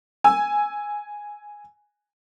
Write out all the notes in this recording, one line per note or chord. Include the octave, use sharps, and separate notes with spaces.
G#5 E6